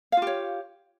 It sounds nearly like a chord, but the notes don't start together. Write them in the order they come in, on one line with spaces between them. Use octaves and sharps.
F5 F4 G4 C#5